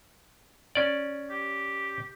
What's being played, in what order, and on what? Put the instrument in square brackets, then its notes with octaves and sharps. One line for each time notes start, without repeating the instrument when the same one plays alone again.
[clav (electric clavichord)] C#4 D5
[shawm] G4